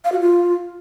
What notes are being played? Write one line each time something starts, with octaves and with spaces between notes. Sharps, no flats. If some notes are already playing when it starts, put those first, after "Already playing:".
F5
F#4
F4